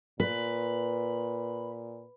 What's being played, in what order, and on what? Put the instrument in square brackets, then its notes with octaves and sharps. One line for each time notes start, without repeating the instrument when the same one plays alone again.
[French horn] A#2 [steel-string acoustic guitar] B4